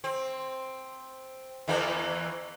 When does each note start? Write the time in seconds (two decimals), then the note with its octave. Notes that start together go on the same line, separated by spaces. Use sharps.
0.04 C4
1.68 E2 E3 A#3